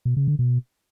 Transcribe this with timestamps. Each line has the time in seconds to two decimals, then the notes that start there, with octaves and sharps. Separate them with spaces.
0.05 B2
0.17 C#3
0.28 D3
0.39 B2